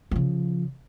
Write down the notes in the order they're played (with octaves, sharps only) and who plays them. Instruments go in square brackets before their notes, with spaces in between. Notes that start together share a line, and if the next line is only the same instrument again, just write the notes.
[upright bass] C#3 F3